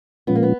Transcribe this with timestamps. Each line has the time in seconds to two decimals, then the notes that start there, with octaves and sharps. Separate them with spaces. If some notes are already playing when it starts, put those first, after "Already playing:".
0.27 A#2 F3 G#3 B3 C#4 F4
0.35 A#3
0.43 B3